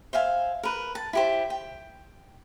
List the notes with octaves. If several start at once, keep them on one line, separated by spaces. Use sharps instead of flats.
C5 E5 F5 G#5
A#4 B4
A5
E4 G4 C5
G5